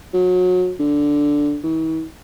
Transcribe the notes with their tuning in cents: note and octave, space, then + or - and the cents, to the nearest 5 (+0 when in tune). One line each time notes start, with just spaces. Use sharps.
F#3 -30
D3 -5
E3 -45